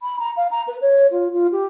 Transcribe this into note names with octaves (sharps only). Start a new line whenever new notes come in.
B5
A#5
F5
A#5
B4
C#5
F4
F4
G4